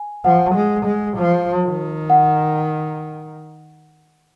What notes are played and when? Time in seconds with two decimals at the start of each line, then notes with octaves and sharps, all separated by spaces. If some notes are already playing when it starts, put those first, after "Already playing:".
Already playing: G#5
0.25 F3 F#5
0.55 G#3
0.86 G#3
1.18 F3
1.64 D#3
2.10 F#5